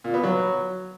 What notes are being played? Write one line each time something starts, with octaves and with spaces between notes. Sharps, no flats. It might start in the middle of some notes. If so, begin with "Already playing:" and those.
A#2
B3
F#3